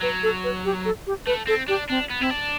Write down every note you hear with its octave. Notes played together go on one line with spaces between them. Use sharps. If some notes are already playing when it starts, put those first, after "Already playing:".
F#3 B4
A4
B4
G4
A4
G4
A3 B4
C4 A4
D4 G4
C4 D4
B3
C4 E4
D4